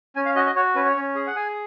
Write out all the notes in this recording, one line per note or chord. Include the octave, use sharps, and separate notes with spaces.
C#4 G#5
F5
F#4 D#5
D#5
F#4 C#5
C#4 B4
C#5
C#4
G#4
F#5
G#4 G#5